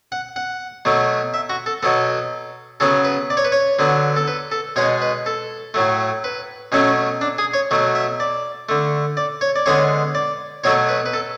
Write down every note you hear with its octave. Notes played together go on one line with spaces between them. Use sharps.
F#5
F#5
B2 F#3 A3
E5
F#4
A4
B2 F#3 B3 A4
C#3 F#3 B3 A4
B4
D5
C#5
B4
C#5
D3 F#3 B3
A4
B4
A4
B2 G#3 B3 C#5
B4
A4
A2 F#3 A3
B4
B2 F#3 A3 C#4
D4
G#4
C#5
B2 F#3 A3
E5
D5
D3 A3
D5
C#5
D5
D3 G#3 B3 C#5
D5
B2 F#3 A3 C#5
B4
B4
A4